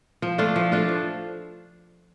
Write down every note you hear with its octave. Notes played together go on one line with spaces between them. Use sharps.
F3
A3 D4 F4
F3
A3 D4 F4
F3